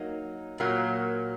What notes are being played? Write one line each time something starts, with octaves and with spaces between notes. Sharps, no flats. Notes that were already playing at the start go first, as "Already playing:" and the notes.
Already playing: F#3 A#3 D#4
A#2 F#3 A#3